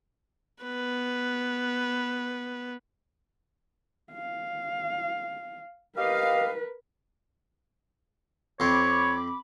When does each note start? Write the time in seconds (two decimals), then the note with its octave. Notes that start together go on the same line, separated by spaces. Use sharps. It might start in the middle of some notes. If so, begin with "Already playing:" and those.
0.64 B3 B4
4.12 F5
5.97 G4 A#4 B4 D#5 F5
8.60 F2 C4 C#5 B5 D6